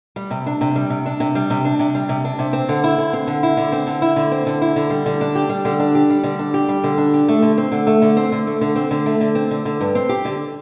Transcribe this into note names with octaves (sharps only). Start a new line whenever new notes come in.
G3
C3
D4
C3
G3
C3
D4
C3
G3
C3
D4
C3
G3
C3
D4
C3
C4
D3
E4
D3
C4
D3
E4
D3
C4
D3
E4
D3
C4
D3
E4
D3
G3
D3
D4
G4
G3
D3
D4
G4
G3
D3
D4
G4
G3
D3
D4
G4
A3
D3
C4
D3
A3
D3
C4
D3
A3
D3
C4
D3
A3
D3
C4
D3
D3
G2
C4
G4
D3